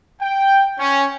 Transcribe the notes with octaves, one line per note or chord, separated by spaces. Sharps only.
G5
C#4